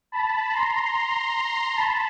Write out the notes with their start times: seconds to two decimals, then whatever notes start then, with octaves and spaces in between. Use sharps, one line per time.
0.12 A5 B5
0.53 A#5 C6
1.76 A5 B5